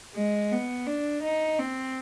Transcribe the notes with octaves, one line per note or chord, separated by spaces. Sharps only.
G#3
B3
D4
D#4
C4